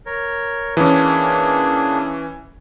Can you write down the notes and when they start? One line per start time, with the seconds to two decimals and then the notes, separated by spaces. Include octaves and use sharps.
0.06 A#4 C#5
0.77 E3 A#3 C#4 D4 G#4